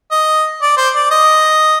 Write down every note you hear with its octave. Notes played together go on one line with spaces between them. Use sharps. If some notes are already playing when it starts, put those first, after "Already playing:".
D#5
D5
C5
D5
D#5